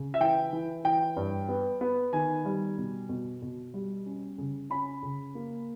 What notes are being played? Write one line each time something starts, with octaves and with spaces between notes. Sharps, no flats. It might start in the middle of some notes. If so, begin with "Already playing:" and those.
Already playing: C#3
E5
E3 G5
E3
E3 G5
G2
B3
B3
D#3 G#5
G3
B2
B2
B2
G3
C#4
C#3
C#4 B5
C#3
A#3